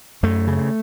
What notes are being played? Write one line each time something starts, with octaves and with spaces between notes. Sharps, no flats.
F#2 A3
C#3